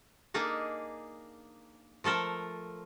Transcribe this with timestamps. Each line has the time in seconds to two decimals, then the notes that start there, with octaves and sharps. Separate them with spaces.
0.34 A#3 D4 D#4 G#4
2.04 F3 A3 A4 A#4